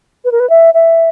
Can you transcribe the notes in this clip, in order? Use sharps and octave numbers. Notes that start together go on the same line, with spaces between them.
B4
A#4
B4
E5
E5